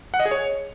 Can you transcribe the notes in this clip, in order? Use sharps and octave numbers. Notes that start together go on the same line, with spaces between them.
F#5
D#5
G#4
C#5